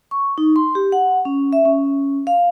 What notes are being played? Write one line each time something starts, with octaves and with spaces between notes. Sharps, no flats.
C#6
D#4
C6
G4
F#5
C#4
E5
C#4
F5